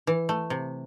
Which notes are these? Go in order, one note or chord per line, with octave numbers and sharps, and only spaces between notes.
E3
A3
C3